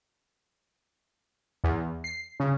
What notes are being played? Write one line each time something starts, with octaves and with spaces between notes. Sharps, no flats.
E2
C7
C#3